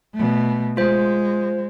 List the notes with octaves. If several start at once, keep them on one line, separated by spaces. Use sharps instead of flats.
B2 A3
G#3 F4 C5